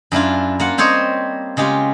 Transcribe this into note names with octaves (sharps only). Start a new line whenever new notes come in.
F#2 D4 E4 F4
A#3 F4 F#5
G3 C4 G4 C5 C#5 D#5
C#3 G#3 F4 G4